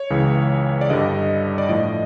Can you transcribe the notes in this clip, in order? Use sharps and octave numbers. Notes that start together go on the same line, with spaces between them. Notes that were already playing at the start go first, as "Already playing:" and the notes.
Already playing: C#5
C#2 C#3 E3
D5
G2 D3 G3 D#5
D5
A2 F3 D#5